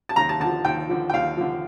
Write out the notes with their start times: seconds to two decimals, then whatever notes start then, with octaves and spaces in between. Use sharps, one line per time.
0.09 A5
0.16 D#2 A#5
0.29 A5
0.40 D3 A5
0.45 F3
0.65 D#2 G5
0.89 D3 F3
1.10 G5
1.13 D#2 F5
1.37 D3 F3